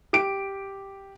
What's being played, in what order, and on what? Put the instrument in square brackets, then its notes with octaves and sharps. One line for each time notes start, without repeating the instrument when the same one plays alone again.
[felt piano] G4 D7